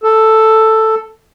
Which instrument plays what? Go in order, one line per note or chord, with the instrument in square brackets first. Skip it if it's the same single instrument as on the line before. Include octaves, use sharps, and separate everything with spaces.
[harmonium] A4